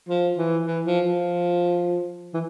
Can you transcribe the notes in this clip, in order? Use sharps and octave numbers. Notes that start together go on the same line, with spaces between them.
F3
E3
E3
F3
F3
E3